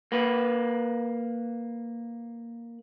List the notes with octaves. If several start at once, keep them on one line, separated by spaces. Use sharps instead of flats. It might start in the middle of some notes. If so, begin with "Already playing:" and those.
A#3 B4